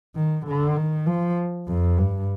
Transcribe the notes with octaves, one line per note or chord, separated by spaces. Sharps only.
D#3
D3
D#3
F3
F2
G2